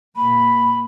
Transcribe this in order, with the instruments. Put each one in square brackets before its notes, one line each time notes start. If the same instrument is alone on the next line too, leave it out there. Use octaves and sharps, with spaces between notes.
[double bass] A#2 A#3 [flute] B5